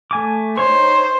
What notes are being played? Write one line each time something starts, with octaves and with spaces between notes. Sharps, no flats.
A3 G#5 D6
D#4 C5 C#5 C#6